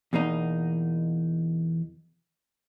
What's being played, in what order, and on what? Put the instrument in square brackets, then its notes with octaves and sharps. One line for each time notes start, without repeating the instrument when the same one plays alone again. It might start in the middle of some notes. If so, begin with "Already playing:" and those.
[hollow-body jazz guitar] E2 B2 A#3 D#4